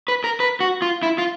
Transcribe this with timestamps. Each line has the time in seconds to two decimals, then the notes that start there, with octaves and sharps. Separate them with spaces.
0.08 B4
0.24 A#4
0.40 B4
0.60 F#4
0.82 F4
1.03 E4
1.18 F4